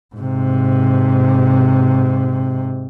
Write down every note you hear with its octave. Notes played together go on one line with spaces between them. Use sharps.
G#2 C3